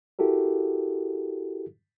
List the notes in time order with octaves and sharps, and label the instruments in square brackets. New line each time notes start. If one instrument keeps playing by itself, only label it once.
[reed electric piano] E4 F#4 G4 A4 A#4